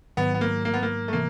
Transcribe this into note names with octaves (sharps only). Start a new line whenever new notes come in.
G#2 D#3 F#3 B3
B3
A#3
A#3
B3
A#3
A3
C3 E3 A#3